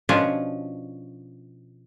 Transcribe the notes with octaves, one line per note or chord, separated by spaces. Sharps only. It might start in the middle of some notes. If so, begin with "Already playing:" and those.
B2 F3 C#4 D4 C#5